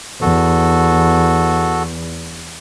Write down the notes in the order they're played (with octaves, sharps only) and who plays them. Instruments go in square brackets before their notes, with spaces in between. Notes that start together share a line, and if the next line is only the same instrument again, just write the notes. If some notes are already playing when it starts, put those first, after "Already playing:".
[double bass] E2 [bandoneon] F#4 A4